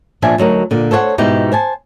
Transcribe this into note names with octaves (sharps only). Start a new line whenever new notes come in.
A#2 F3 D4 E5 G#5
D2 F#3 D#4 A#4
A#2 D3
A4 C5 C#5 E5 F#5
G#2 B2 D#4 E4 G4
C5 G#5 A5